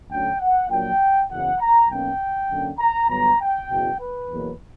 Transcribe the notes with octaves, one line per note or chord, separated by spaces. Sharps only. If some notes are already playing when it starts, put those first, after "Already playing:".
D2 D3 F#3 C#4 G5
F#5
A#1 A#2 F#3 G5
F#1 E2 C#3 F#5
A#5
B1 B2 A#3 C#4 G5
F#2 D3 A#3 C#4
A#5
G1 G2 F#3 B3 A#5
G5
F#1 E2 B2
B4
E2 B2 F#3 A#3